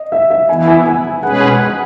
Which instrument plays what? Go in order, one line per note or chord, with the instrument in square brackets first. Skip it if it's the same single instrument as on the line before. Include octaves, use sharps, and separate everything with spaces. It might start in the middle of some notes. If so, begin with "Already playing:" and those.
Already playing: [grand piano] D#5
E5
E5
[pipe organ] E3 B3 E4 [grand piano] G#5
[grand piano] G#5
G#5
[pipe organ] B2 G#3 C#4 G#4 B4 [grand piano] F#5
[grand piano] G#5
F#5